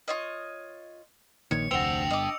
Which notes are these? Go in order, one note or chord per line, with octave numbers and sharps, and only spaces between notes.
F4 C#5 D#5
A#1 A#2 D#3 C#5 C#7
F1 D2 D4 C5 F#5 G5 E6 F7
G1 D#5 D6